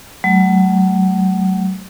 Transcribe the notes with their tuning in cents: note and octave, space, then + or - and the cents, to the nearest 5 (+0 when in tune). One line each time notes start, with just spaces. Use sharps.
F#3 +25 A3 -15